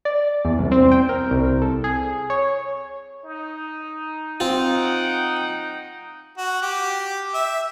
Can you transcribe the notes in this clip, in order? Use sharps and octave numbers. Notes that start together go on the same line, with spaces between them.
D5
E2
C2
C4
G5
A#4
C2
A4
G#4
C#5
D#4
C4 F4
F#5 G5
F#4
G4
E5